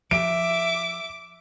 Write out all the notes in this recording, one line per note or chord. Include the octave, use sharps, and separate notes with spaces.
F3 E5 D6 D7